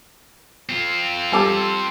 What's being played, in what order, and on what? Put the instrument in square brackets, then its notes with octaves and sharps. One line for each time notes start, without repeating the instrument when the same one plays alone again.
[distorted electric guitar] C4 F4
[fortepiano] G3 A4 D6